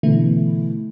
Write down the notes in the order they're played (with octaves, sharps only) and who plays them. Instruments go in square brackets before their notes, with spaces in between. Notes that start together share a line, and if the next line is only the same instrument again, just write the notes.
[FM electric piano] B2 D3 E3 A3 E4